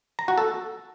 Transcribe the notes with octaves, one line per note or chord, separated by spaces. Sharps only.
A#5
F#4
A4